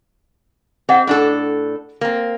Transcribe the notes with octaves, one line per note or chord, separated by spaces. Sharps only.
C4 G#4 D#5 F#5
A2 D4 A4
A#3 C4